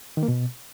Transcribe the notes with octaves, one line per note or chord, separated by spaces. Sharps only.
D#3
A#3
B2